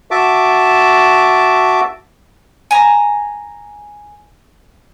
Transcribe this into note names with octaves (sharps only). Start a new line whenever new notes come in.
F#4 E5 A5 D6
G#5 A#5